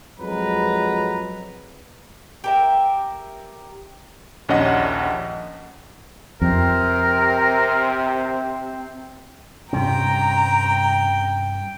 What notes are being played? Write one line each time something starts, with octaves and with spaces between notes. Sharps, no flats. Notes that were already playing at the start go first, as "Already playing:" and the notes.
F2 F#3 G#3 B4 A#5
G4 A#4 E5
A#1 D#2 C#4 D4 D#5 F#5
F2 C3 C4 A#4
G2 C3 G3 C#4 G5 A#5